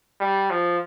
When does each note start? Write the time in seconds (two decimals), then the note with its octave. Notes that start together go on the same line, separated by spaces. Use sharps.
0.20 G3
0.50 F3